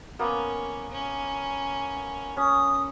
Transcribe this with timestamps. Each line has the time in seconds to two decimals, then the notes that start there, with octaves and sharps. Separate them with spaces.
0.19 A#3 B3 C#4
0.92 C#4
2.37 C#4 D#6